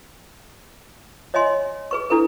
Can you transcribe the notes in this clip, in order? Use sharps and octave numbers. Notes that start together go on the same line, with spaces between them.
C#5 D#5 E5 G#5 C6
G#4 B4 C#6
D4 E4 A4 B4